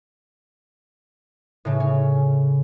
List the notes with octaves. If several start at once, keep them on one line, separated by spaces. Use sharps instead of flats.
A2 C#3
C#4